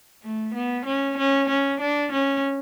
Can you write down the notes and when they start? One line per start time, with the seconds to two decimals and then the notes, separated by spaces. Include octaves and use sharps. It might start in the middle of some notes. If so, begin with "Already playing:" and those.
0.22 A3
0.54 B3
0.85 C#4
1.17 C#4
1.49 C#4
1.80 D4
2.12 C#4